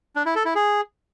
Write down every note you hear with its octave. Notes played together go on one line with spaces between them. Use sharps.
D4
E4
A4
E4
G#4